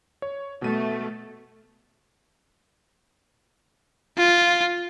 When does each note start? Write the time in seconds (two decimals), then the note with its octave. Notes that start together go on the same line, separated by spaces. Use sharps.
0.22 C#5
0.62 B2 A3 D#7
4.18 F4